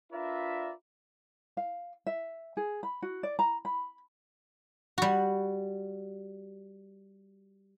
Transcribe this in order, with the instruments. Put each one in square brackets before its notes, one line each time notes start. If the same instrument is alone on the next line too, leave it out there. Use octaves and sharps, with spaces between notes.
[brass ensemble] D4 F4 A#4 B4 D5 E5
[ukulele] F5
E5
G#4
B5
F#4
D5
A#5
B5
[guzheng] G3 F#4